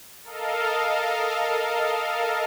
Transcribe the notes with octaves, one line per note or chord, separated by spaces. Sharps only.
A4 A#4 D#5 F5